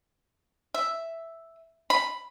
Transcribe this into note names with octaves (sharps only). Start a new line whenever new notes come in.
E5
B5